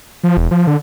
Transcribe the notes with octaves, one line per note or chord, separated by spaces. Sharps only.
F3
E1
F3
D3